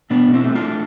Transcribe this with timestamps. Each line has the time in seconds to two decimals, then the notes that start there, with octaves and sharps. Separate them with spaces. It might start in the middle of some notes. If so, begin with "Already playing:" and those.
0.10 B2 B3 D4
0.28 B2
0.34 C4 E4
0.44 A3
0.55 D4 F4
0.62 A3